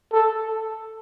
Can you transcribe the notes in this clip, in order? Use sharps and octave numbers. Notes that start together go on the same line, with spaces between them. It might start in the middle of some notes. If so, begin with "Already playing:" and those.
A4